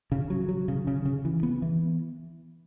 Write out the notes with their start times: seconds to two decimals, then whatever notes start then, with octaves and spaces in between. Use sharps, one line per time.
0.12 C#3
0.30 F#3
0.49 F#3
0.68 C#3
0.87 C#3
1.05 C#3
1.25 E3
1.43 B3
1.62 E3